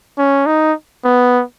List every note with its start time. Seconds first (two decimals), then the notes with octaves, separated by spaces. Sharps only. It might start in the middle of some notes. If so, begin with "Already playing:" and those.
0.18 C#4
0.46 D#4
1.04 B3